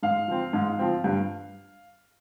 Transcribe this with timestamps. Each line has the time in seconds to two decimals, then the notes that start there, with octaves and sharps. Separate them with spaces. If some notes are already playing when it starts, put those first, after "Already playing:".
0.03 G#2 F5
0.28 F3 C4
0.53 G#2
0.79 F3 C4
1.04 G2